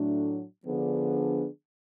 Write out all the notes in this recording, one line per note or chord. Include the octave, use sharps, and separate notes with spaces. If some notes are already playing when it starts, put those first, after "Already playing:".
Already playing: A2 F#3 A3 D4 F#4
D3 F3 B3 D4 G#4